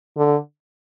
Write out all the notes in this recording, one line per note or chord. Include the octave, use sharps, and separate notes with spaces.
D3